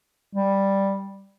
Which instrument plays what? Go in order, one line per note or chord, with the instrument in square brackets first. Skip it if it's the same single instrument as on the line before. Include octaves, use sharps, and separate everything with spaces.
[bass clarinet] G3